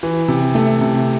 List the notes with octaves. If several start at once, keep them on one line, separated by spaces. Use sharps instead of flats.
E3
C3
A3
C3